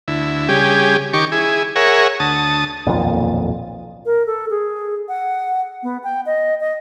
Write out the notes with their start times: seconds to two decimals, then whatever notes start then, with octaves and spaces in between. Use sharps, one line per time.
0.08 D2 E4
0.49 C#3 G3 G4 G#4
1.13 D#3 G4 C#6 D6
1.32 E4 G#4
1.76 G#4 A#4 C#5 E5 F#5
2.20 D2 A5 D#6
2.87 D#1 B1 F2 A#2
4.06 A#4
4.26 A4
4.50 G#4
5.09 F#5
5.83 B3
6.04 G5
6.26 D#5
6.60 D#5